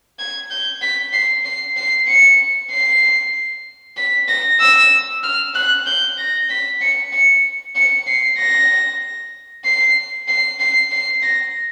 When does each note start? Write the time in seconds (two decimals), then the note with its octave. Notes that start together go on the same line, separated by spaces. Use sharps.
0.19 G#6
0.50 G6
0.82 B6
1.13 C7
1.45 C7
1.77 C7
2.07 C#7
2.70 C7
3.97 B6
4.28 A#6
4.60 E6
5.23 F6
5.55 F#6
5.86 G6
6.18 A#6
6.50 B6
6.81 C#7
7.12 C#7
7.75 C#7
8.06 C7
8.38 A#6
9.64 C7
10.28 C7
10.60 C7
10.91 C7
11.22 A#6